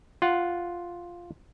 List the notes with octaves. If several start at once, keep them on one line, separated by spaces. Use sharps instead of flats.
F4 F#5